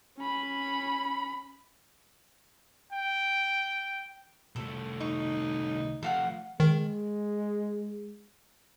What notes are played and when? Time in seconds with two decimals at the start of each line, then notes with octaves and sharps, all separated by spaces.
0.18 C#4 B5
2.93 G5
4.56 C2 A3 A4
5.00 D#4 C#6
6.03 F3 A3 A4 F5 F#5
6.60 D#3 G#3